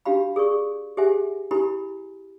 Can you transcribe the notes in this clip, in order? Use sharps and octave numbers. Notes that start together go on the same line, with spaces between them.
D4 F#4 G4 F5 B5
G#4 A#4 D5 C#6
G4 G#4 C5 E5 F#5 G#5
E4 G4 A#4 G#5 B5